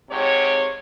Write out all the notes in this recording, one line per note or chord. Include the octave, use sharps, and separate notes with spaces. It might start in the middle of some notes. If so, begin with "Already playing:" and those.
G#2 C3 C4 C#5